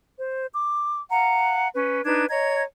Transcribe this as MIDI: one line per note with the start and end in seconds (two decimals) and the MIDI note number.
0.19 0.47 72
0.54 1.01 86
1.11 1.68 77
1.11 1.68 78
1.11 1.68 82
1.74 2.04 61
1.74 2.04 71
2.05 2.25 62
2.05 2.25 63
2.05 2.25 71
2.05 2.25 92
2.29 2.63 73
2.29 2.63 75
2.29 2.63 82
2.29 2.63 92